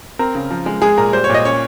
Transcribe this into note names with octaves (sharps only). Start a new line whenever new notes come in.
C4 A#4
C#3
F3
G#3
G#3 G#4
A#2 A#4
G3 C5
C#5
A#2
D#5
C#4 C#5